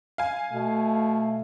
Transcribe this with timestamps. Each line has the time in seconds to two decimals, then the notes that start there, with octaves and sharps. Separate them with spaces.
0.18 F5 G#5
0.53 B2 A3